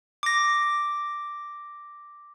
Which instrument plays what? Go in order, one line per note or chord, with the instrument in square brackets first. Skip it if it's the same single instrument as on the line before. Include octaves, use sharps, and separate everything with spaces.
[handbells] D6 A#6